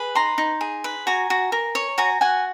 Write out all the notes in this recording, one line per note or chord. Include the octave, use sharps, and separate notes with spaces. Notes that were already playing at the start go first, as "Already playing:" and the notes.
Already playing: G#4 B4
D#4 A#5 C6
D#4
G#4
B4
F#4 G#5 A#5
F#4
A#4
C#5
F#4 G#5 A#5
F#4 F#5 G#5